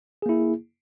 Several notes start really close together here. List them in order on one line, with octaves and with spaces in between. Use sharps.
G#4 A#3 E4